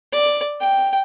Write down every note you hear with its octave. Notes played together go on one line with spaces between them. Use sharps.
D5
G5